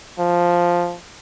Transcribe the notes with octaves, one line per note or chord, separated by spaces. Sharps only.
F3